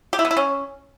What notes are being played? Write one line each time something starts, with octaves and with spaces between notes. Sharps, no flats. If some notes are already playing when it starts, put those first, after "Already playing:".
G4
E4
B3
E4
C#4